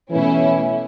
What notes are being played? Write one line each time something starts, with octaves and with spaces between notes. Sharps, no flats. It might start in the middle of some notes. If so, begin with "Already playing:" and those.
B2 E3 A3 C#4 E4